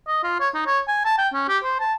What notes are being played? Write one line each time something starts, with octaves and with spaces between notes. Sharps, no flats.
D#5
F4
C#5
D#4
C#5
G#5
A5
G5
C#4
G4
C5
A5